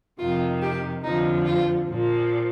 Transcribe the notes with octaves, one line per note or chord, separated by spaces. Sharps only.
F2 C3 D#3 F4
G4
F2 D3 F3 D#4
F4
A#2 F3